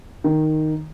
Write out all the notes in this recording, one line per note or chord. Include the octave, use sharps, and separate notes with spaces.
D#3